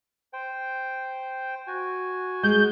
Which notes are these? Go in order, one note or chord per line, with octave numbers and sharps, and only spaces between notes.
C5 G5
F#4 G#5
G#3 G6